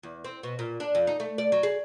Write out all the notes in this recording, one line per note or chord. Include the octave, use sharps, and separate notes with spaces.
E2
C4
B2
A#2
D4
F2
D#4
A3
D5
F#3
G#4